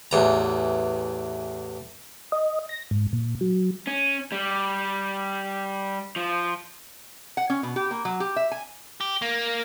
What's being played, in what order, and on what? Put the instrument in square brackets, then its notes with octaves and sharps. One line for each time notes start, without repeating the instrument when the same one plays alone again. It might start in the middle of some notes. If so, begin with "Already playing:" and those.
[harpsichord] A1 E2 A#5
[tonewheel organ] D#5
A#6
G#2
A#2
F#3
[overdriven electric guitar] C#4
G3
F3
[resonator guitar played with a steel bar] F#5
C#4
B2
G4
A#3
F#3
G4
E5
G#5
[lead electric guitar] G4
A#3